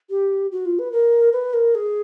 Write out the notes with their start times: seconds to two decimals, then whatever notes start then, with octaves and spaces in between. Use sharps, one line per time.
0.10 G4
0.52 F#4
0.65 F4
0.79 B4
0.92 A#4
1.33 B4
1.54 A#4
1.75 G#4